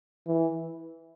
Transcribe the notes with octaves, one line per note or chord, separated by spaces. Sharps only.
E3